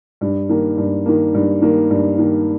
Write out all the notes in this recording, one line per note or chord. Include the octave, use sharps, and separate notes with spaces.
G2
D#3 A#3
G2
D#3 A#3
G2
D#3 A#3
G2
D#3 A#3